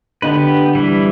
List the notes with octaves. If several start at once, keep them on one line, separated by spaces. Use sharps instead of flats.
D3 B3 G4 B4
E3 G3 E4